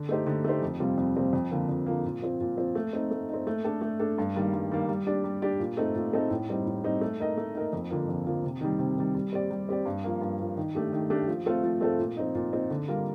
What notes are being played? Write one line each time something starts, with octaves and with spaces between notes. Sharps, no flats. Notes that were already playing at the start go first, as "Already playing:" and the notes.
Already playing: D3
A3 D#4 G4 C5
D3
A3 D#4 G4 C5
F2
C3 G3 C4 F4
F2
C3 G3 C4 F4
F2
D3 F3 A#3
F2
D3 F3 A#3
A#2
F3 C4
A#2
F3 C4
A3
C4 D#4
A3
C4 D#4
A3
D4 A4
A3
D4 A4
G2
D#3 G3 A#3
G2
D#3 G3 A#3
G3
D4 G4 D5
G3
D4 G4 D5
A#2
A3 C4 D#4 A4
A#2
A3 C4 D#4 A4
A2
G3 C4 D#4
A2
G3 C4 D#4
A3
D#4 A#4 D#5
A3
D#4 A#4 D#5
F2
D3 F3 A#3
F2
D3 F3 A#3
C3
D#3 G3
C3
D#3 G3
G3
C4 G4 D5
G3
C4 G4 D5
G2
F3 A#3
G2
F3 A#3
D#3
A3 D4 G4
D#3
A3 D4 G4
F3
A3 C4 F4 A4
F3
A3 C4 F4 A4
A#2
F3 C4 D#4
A#2
F3 C4 D#4
D3
G3 A#3 F4 A#4